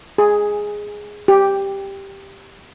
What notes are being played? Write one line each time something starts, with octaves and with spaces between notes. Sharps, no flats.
G#4
G4